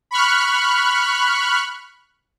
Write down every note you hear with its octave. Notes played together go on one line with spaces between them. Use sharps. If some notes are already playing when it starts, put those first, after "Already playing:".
B5 C#6 F6 F#6